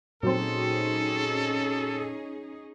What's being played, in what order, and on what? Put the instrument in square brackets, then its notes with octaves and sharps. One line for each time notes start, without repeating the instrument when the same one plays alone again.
[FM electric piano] A#2 [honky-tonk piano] F#3 C4 [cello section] C#4 D#4 G#4 [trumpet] A4